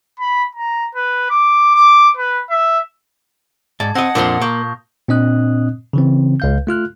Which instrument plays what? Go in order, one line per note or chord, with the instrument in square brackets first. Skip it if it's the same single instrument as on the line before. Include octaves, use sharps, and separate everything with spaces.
[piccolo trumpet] B5
A#5
B4
D6
D6
B4
E5
[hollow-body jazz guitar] G#2 D5 [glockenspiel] A5 G#6
[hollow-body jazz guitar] C4 D#5 [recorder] F#5 [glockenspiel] D#6 A#6
[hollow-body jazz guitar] F2 F3 D4 [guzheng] A#2 C6
[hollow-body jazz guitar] A#3 [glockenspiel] C#6 G6
[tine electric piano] A#2 C4 D4 D#5 D#6 F#6
C#3 E3 C4
C#2 F5 G6
A3 F4 F6 F#6